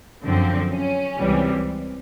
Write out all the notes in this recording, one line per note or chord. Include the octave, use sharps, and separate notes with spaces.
F#2 D3 F3 C4
C#4
C#2 C3 E3 G3